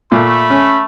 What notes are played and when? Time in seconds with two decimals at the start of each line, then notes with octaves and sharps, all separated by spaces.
0.12 A#2 A3 B5
0.50 C#4